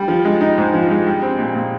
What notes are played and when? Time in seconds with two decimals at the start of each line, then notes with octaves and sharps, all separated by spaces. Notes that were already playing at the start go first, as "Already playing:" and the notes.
Already playing: G3
0.08 F3
0.25 G#3
0.41 D#4
0.58 G#2
0.74 F3
0.90 G#3
1.07 G3
1.22 C4
1.39 A#2
1.55 A#2